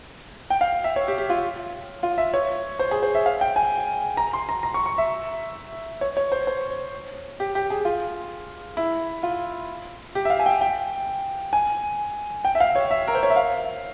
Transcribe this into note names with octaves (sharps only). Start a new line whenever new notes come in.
G5
F5
E5
C#5
G4
G4
F4
F4
E5
C#5
C5
G#4
C5
E5
F5
G5
G#5
A#5
C6
A#5
A#5
C#6
C#6
E5
C#5
C#5
C5
C5
G4
G4
G#4
F4
E4
F4
G4
E5
F5
G#5
G5
G5
G#5
G5
E5
F5
C#5
E5
A#4
C5
C#5
E5
F5